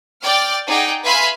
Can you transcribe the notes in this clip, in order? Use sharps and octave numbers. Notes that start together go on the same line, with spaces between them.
D5 G5 D6 F6 A6
D#4 G#4 D5 F#5 G5 A#5
B4 E5 F5 G#5 B5 C6